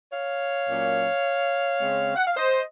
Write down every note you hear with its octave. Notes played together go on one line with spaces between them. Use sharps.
C#5 F5
A#2 F#3 A#3 C#4
C#3 G#3 C4
F#5
F5
C5 D#5